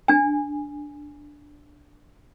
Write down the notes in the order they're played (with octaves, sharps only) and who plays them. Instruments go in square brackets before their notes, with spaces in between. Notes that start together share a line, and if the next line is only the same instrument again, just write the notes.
[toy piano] D4 G#5